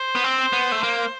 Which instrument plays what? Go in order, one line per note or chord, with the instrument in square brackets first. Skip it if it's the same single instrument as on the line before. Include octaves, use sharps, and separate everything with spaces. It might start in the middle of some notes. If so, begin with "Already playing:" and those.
Already playing: [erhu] C5
[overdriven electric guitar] B3
C4
B3
A3
A#3